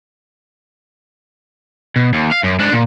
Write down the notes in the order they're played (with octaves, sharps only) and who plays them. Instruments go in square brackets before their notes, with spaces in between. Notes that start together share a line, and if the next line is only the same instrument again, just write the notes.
[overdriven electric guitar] B2
D#2
F5
F#2
G#2 D4
A#2